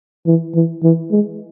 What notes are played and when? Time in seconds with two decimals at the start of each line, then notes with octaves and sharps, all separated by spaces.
0.26 E3
0.55 E3
0.83 E3
1.11 G#3